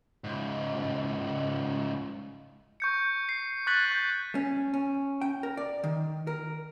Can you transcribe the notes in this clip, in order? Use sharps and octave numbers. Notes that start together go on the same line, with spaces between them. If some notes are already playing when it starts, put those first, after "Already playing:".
C#2 G#2
C#6 G6 C#7
C7
C#6 F#6 A6 B6 F#7
G6
C#4
C#4
G5
A#4
D5
D#3
A#4